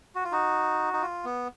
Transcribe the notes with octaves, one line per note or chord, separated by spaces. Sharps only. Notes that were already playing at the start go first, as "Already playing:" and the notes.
F#4
F4
D#4 F#4
D#4
F4
B3